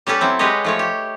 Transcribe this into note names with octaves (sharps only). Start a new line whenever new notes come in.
G3 C#4 G4 A4 B4
F#3 C4 E4
G#3 G4 B4 C#5 D#5
F3 A3 C#5
G4